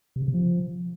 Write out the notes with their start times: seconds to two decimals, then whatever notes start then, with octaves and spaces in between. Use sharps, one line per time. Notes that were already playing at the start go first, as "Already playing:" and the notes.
0.16 C3
0.22 C#3
0.28 C3
0.34 F3